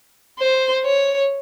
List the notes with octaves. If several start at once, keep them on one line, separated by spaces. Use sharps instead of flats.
C5
C#5